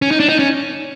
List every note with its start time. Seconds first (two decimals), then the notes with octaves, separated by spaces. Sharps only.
0.02 C#4
0.11 D#4
0.20 D4
0.29 D#4
0.39 C#4